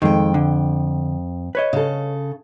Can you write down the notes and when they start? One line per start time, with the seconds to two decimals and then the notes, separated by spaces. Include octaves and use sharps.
0.02 F2 D#3 G#3 G5
0.34 D3
1.55 B4 C#5 D#5
1.73 C#3 A4